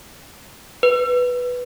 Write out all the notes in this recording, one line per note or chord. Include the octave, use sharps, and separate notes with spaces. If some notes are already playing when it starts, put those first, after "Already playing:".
B4